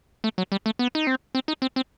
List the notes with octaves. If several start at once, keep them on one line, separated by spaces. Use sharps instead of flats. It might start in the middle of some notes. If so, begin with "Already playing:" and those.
A3
F#3
G3
A3
B3
D#4
C4
C4
D#4
C4
C4